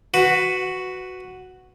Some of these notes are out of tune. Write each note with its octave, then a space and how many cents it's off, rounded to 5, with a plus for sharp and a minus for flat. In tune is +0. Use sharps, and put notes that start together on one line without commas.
F#4 +0 B4 +10